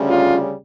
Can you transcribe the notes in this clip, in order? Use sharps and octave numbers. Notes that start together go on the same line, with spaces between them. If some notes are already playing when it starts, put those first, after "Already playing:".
Already playing: D2 C#3 G3 C#4
F4